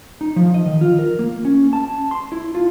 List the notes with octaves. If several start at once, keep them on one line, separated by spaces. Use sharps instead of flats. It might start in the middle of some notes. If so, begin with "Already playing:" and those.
D#4
F3
D#5
D#3
F4
A#4
A#3
C#4
A5
C6
E4
F4